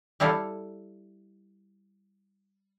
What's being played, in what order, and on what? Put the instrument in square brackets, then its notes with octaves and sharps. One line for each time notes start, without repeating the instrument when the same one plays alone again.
[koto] G3 E4 A4 F5